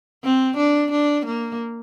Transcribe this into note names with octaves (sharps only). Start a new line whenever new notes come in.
C4
D4
D4
A#3